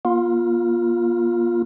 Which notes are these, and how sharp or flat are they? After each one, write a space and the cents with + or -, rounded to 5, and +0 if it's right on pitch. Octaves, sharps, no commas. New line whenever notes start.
A#3 +40 F4 +0